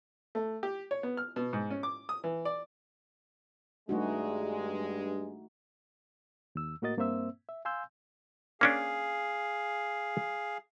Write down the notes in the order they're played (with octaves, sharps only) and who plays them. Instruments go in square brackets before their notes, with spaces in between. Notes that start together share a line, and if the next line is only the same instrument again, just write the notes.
[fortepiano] A3
G4
C#5
B3
F6
B2
G#2
C#4
D6
D#6
E3
D5
[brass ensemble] G2 G#3 [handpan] A3 D#4 F#4
[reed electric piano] D#2 E6
A2 A#3 F#4 A#4 D#5 A6
G2 A#3 C4 C5 E5 E6
E5
F5 G#5 C6 E6 G6
[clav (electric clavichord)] A#3 C#4 D4 [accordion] G#4 F5